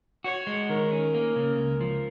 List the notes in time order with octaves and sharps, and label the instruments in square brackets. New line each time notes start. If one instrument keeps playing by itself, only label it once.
[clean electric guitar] F#4 [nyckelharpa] C#5
[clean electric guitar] G#3
[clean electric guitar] D#3 [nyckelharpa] A#4
[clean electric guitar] C#4
A#3
C#3
C#2
F3